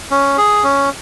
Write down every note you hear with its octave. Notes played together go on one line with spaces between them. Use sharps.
C#4
G#4
C#4